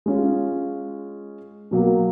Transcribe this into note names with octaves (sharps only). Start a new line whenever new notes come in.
G#3 C#4 F4
B2 F#3 A#3